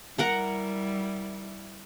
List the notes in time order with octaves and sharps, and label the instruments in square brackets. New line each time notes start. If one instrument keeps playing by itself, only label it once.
[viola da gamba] G3 E4 [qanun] A#4 F#5 A#5